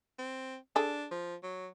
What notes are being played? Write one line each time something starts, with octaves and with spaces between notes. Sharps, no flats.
C4
D4 G#4 A4
F3
F#3